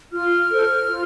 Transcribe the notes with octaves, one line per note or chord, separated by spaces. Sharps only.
F4 F6
A4 C5
F4